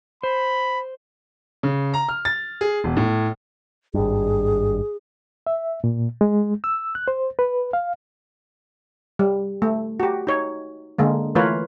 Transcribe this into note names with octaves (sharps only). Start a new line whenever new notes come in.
C5 B5
C#3
A#5
F6
A6
G#4
E1
A2
G#1 G2 G#4
E5
A#2
G#3
E6
F#6
C5
B4
F5
G3
A3
F#4 G4
D#4 C#5
D3 G#3 A#3
E3 A3 F4 A#4 B4 C#5